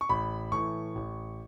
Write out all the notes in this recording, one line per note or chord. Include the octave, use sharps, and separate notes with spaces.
C#6
A1 B5
A2 E3 C#6
A1